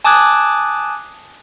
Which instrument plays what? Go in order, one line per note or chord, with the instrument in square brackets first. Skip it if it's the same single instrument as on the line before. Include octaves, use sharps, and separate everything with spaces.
[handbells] G#5 A5 D6 D#6 F#6 G#6